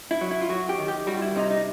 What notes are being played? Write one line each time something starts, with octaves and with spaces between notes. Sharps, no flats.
E4
F#3
E4
F4
F#3 F#4
G4
D#3
G4
G3 F#4
F4
E4
C3 D#4
D#4